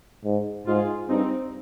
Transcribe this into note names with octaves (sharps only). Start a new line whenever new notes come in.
G#2
G#2 F4 G#4
G2 C4 D#4